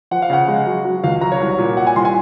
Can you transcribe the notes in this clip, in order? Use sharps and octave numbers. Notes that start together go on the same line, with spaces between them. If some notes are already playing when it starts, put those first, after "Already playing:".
F3 F#5
F5
C#3 F#5
G#3
F#3
F#3
C#2 F5
F#3 A#5
C#5
C2
A#2
C2 F#5
G#5
C2 C6
G#5